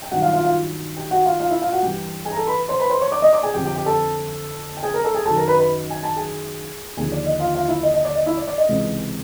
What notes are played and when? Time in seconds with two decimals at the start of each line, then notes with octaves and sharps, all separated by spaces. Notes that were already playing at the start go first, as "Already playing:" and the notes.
0.02 G5
0.11 G2 D#3 F#3 F#4 F#5
0.22 F4 F5
0.33 F4 F5
0.44 F4 F5
0.97 G4 G5
1.11 F#4 F#5
1.25 F4 F5
1.40 F4 F5
1.50 E4 E5
1.62 F4 F5
1.72 F#4 F#5
1.82 G2 E3 G4 G5
2.25 G#4 G#5
2.31 A#5
2.37 A4 A5
2.47 B4 B5
2.68 C5 C6
2.80 B4 B5
2.90 C5 C6
3.00 C#5 C#6
3.12 D5 D6
3.22 D#5 D#6
3.33 D5 D6
3.43 G#4 G#5
3.54 F2 D3 F3 G4 G5
3.65 G4 G5
3.76 G4 G5
3.86 A4 A5
4.77 G5
4.83 G#4 G#5
4.94 A#4 A#5
5.04 A4 A5
5.15 G#4 G#5
5.25 F#2 D#3 F#3 A4 A5
5.36 A#4 A#5
5.48 B4 B5
5.58 B4 B5
5.90 G#5
6.03 A5
6.16 G#4 G#5
6.97 D#2 D3 F3 G#4 G#5
7.12 D5
7.26 D#5
7.40 F4 F5
7.55 F4 F5
7.68 E4 E5
7.83 D#5
7.94 D#5
8.05 D5
8.15 D#5
8.26 E4 E5
8.37 D5
8.47 D5
8.58 D#5
8.69 C#2 C3 E3